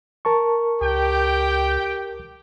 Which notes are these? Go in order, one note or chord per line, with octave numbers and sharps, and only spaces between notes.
A#4 A5 C#6
C#2 G4 G5